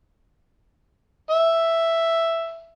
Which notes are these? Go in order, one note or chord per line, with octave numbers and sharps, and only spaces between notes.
E5